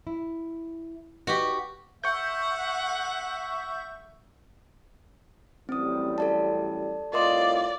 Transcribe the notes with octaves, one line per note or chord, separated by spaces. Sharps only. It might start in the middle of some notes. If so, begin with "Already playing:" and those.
E4
F#4 G4 B4 D5 D#5
E5 F#5 C#6 G6
A1 F#2 G3 C4 D#6
A4 D5 A5
C2 A2 F4 A#4 D5 D#5 C6